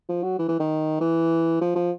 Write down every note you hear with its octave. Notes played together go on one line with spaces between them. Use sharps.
F3
F#3
E3
E3
D#3
E3
F3
F3